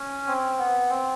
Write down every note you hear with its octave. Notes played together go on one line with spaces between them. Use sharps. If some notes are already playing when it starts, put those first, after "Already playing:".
Already playing: C#4
C4
B3
C4